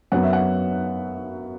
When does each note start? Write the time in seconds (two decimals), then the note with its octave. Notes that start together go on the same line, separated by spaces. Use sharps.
0.12 F#2 F#3 B3 F#5
0.23 E5
0.33 F#5